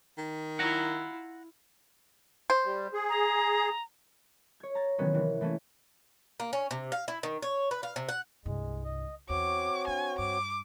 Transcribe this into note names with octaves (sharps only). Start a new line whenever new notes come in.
D#3
E4 F4 F#5 A#5
C5
G3
G#4
A#5
C#5 G#6
A#5 A6
C3 D#3 E3 F#3 B3 C#4
C3 E3
E3 A3 A#3 C#4
A#3
C#4
C3
F5
E4
D#3
C#5
B4
F5
C3
F#5
C2 G2 G#3
D#5
E2 C4 F#4 C#5 D6
D4 G#5
G2 D6